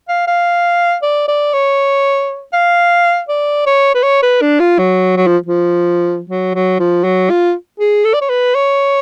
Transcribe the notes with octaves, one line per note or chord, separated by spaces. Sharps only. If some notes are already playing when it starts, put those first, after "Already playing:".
F5
F5
D5
D5
C#5
F5
D5
C#5
B4
C#5
B4
D4
F4
F#3
F#3
F3
F3
F#3
F#3
F3
F#3
F4
G#4
A4
D5
C#5
B4
C#5